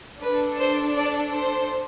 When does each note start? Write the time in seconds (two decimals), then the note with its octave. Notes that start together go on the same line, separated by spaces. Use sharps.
0.21 D4 A4 B4
0.58 C5
0.96 D5
1.33 C5